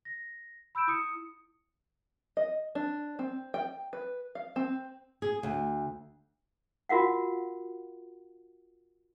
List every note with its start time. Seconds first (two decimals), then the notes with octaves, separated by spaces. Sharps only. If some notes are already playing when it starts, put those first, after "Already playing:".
0.05 A#6
0.75 B5 E6 G6 D7 E7
0.88 E4 D#6 C#7
2.37 D#5
2.75 D4
3.19 C4
3.54 G5
3.93 B4
4.35 F5
4.56 C4
5.22 G#4
5.43 D2
6.89 F4 F#4 A#4 F5 F#5